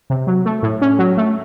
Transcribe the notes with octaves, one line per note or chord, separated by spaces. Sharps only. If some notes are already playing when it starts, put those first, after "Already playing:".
C3
F#3
A3
A2
C#4
F#3
A3